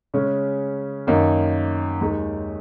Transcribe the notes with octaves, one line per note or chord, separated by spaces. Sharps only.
C#3 G#3 C#4
F#2 D#3 A#3 D#4
D#2 D#3 G#3 D#4